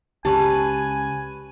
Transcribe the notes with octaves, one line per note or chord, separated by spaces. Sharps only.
C#2 C#3 G4 B4 C#5 G#5 A5